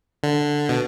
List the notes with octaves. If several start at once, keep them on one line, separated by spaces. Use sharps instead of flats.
D3
B2